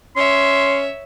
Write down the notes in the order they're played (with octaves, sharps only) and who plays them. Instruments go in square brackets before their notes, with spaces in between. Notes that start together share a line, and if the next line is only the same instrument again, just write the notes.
[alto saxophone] C#4 [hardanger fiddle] C#5 E5 [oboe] C6